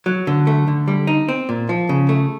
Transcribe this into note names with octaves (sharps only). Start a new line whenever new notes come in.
F#3
D3
A3
D3
G3
D#4
C4
A#2
F3
C#3
A3